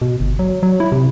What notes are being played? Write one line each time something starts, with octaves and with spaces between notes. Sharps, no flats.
B2
G1
F#3
F#3
E4
C3